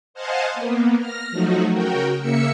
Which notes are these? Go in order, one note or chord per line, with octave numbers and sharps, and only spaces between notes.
C5 D#5 F5 F#5 G#5 A5
A#3 B3
F6 A#6
F3 F#3 A3 D#4 F#4
C#3 F#4 A#4 G5
C#3 A#3 E5 E6 C#7